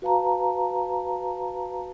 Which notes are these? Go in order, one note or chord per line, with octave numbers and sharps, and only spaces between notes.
F#4 B4 F5 A5 A#5